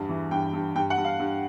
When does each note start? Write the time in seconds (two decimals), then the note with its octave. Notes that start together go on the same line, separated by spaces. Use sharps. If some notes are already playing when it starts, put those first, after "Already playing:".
Already playing: E2 G2
0.09 E3
0.31 G2 G5
0.53 G2
0.75 G2 G5
0.90 F#5
0.97 G2
1.05 F5
1.19 G2